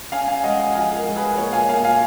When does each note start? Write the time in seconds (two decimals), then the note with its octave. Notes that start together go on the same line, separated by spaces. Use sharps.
0.12 C#4 F5 G#5
0.28 F5 G#5
0.43 G#3 D#5 F#5
0.59 F5 G#5
0.74 F3 F5 G#5
0.91 G#4
0.96 A#4
1.06 G#3
1.16 G#4 B4
1.37 A#2 A#4 C#5
1.53 F5 G#5
1.69 A#2 F5 G#5
1.84 F5 G#5